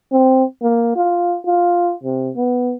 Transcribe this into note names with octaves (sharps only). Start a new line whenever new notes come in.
C4
A#3
F4
F4
C3
B3